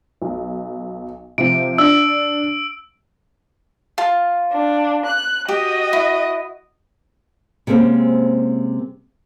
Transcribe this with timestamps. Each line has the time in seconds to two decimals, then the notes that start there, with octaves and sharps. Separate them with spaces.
0.22 B1
1.38 C3 F3 D7
1.78 D4 E6
3.98 F4 A5
4.52 D4
5.06 F#6
5.49 F#4 G4 D#5
5.93 E4
7.67 C3 G#3 A#3 C4 C#4